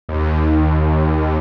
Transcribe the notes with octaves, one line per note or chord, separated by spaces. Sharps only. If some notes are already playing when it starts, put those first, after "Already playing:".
D#2